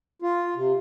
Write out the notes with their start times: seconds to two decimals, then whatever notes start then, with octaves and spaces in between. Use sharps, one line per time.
0.22 F4
0.56 C3